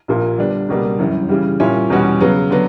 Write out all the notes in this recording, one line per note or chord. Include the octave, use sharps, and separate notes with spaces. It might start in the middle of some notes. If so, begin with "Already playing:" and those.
A#1 A#2 A#3
D3 G3 B3 D4
C#2 B2 G3 A#3 D4
G1 F#2 E3
C#3 E3 G3
A#2 G3 C#4 E4
E2 B2 G3 C#4 F#4
C#3 F#3 B3
D3 F#3 B3